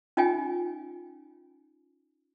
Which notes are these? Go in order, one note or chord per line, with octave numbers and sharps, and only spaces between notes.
C#4 D#4 F4 D#5 G5 G#5